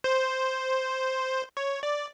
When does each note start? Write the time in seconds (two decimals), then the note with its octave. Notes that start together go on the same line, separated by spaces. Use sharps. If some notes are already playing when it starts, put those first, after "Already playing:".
0.04 C5
1.57 C#5
1.83 D5